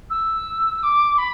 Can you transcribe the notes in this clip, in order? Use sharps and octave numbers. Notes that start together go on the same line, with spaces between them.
E6
D6
B5